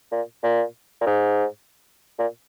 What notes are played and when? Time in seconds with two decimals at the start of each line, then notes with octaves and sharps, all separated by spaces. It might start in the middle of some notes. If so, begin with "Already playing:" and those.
0.11 A#2
0.43 A#2
1.01 A#2
1.06 G#2
2.18 A#2